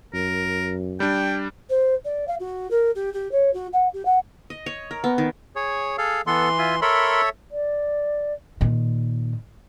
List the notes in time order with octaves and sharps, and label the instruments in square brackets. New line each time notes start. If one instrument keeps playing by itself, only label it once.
[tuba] F#2 [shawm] A#4
[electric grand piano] G3 D4 [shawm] G5
[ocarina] C5
D5
F5
F#4
A#4
G4
G4
C#5
F#4
F#5
G4
F#5
[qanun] D#5
C#5
A#4
B3
D#3
[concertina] G#4 C#5
G#4 A4 F5
[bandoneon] E3 C6 [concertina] B3 A4
[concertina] F4 E5 G#5
[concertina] A4 C#5 E5 [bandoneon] A#4 B5 C6
[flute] D5
[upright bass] A#2 D#3